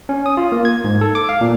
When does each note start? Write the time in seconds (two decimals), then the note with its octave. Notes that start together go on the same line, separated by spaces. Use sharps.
0.09 C#4
0.26 D#6
0.37 F4
0.52 A#3
0.65 G#6
0.84 G#2
1.01 A4
1.15 D6
1.29 F5
1.41 A#2